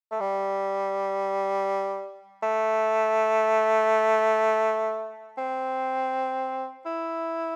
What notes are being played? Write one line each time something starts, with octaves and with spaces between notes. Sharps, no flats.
A3
G3
A3
C4
E4